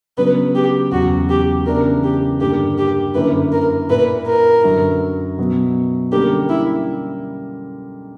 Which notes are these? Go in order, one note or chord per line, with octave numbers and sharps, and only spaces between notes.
C#3 F#3 B3 D4 B4
G4
E2 C#3 F#3 F#4
G4
C#3 E3 B3 D4 A#4
G4
G2 D3 A#3 G4
G4
F#2 D3 A#3 C#4 E4 B4
A#4
A#2 A#3 E4 B4
A#4
F#2 D3 F#3
B2 F#3 B3
D3 G3 A#3 C#4 G4
E4